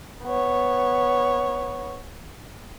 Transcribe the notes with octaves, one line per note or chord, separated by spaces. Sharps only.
B3 C#5